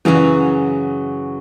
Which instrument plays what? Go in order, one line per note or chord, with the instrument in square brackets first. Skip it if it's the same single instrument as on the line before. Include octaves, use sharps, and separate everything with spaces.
[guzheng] F#2 C#3 F#3 C#4 F#4 [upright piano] E3